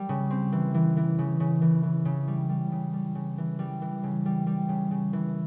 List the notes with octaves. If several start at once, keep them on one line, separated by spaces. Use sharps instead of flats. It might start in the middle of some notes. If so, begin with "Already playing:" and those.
Already playing: G3
C#3
C4
E3
E3
E3
C#3
C#3
E3
E3
C#3
G3
G3
C#3
G3
C#3
E3
G3
E3
C#3
G3
G3
C#3
C#3
E3